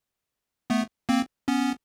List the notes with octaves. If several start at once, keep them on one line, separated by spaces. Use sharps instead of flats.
A3 B3
A#3 C4
B3 C#4